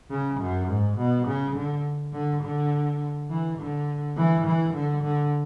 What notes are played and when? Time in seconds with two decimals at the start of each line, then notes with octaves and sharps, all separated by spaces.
0.10 C#3
0.40 F#2
0.69 G#2
0.98 B2
1.27 C#3
1.56 D3
2.13 D3
2.42 D3
3.29 E3
3.58 D3
4.17 E3
4.45 E3
4.74 D3
5.03 D3